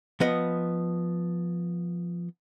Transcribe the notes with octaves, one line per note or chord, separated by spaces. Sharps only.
F3 B3 D#5